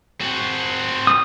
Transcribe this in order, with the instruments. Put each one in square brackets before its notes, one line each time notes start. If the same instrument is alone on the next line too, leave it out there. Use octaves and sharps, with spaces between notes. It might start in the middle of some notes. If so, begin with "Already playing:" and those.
[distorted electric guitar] C4 F#4
[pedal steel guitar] D#6